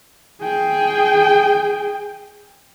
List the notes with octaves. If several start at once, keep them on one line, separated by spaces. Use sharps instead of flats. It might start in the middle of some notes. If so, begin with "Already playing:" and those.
G#4 G5